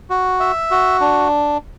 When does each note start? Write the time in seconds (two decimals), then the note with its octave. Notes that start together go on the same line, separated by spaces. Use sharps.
0.10 F#4
0.40 E5
0.71 F#4
1.00 D4